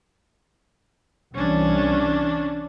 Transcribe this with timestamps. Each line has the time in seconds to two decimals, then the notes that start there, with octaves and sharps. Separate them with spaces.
1.35 C2 E3 C#4 D4